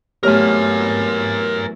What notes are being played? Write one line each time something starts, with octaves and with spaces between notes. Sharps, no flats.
E2 F#3 A3 G4 A#4 C#5 G#5 F6